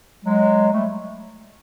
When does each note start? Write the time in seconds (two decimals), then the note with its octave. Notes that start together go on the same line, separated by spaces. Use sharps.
0.24 F#3 G#3
0.72 G3 A3